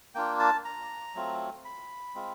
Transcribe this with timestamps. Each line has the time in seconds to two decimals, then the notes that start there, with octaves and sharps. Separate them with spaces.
0.15 A#3 D4 F4 G5
0.40 A5
0.65 A#5
1.15 F#3 A3 C4 F4
1.65 B5
2.15 G#3 C4 F4